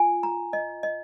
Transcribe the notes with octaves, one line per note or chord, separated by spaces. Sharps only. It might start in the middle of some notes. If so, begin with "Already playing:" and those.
Already playing: F4 G#5
A#5
D#5
D#5